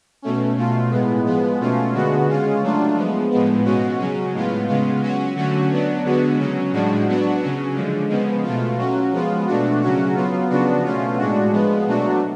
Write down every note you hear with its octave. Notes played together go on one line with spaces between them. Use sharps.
B2 A3 C#4
B2 A3 F4
A2 G#3 B3
F3 G#3 B3
B2 A3 C#4 F4
D3 G#3 B3 F#4
C#3 G#3 C#4 F4
F#3 A3 D4 F4
F3 G#3 B3
A2 F3 G#3 B3
B2 G#3 C#4 F#4
C#3 F#3 C#4
A2 G#3 B3 F4
C#3 G#3 B3 F4
F#3 C#4 F#4
D3 F#3 A3 C#4 F#4
F#3 B3 D4
D3 G#3 B3 F#4
C#3 F#3 C#4
A2 F3 G#3 D4 F#4
F#3 B3 D4 F#4
C#3 F#3 C#4
D3 F3 G#3
C#3 F3 G#3 B3
B2 A3 F4
F#3 C#4 F#4
F3 G#3 B3 F4
B2 A3 D4 F#4
C#3 F#3 C#4 F#4
F#3 B3 F4
C#3 F3 B3 D4 F#4
B2 A3 C#4 F4
A2 G#3 D4 F#4
F3 G#3 B3
B2 F#3 A3 D4 F#4